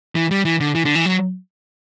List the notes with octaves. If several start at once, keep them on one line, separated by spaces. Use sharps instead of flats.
E3
G3
E3
D3
E3
D3
E3
F#3